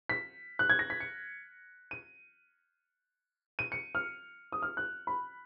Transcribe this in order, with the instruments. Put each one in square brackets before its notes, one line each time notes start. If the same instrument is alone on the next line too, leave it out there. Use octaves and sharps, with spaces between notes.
[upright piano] B6
F#6
G#6
A#6
B6
C#7
D#7
D#7
C#7
F6
D#6
F6
F#6
B5